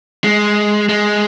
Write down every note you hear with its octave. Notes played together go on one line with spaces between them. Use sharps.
G#3
G#3